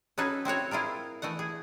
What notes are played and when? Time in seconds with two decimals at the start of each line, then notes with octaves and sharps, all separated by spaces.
0.18 C#4 D#4 F#4 G#4 A4 B4
0.45 C4 E4 F#4 C#5
0.71 E4 F4 G#4 A#4
1.22 E3 A3 D#5 F#5
1.39 G#4